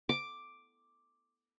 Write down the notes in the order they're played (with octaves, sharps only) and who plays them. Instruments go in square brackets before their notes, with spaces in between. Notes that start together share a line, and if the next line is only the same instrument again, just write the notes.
[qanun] D6